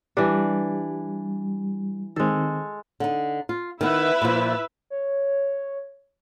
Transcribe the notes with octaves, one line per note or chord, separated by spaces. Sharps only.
E3 G3 D4
D#3 G#3 C4 A4
D3 D#4
F4
D#3 B3 E4 B4 E5
A#2 F3
C#5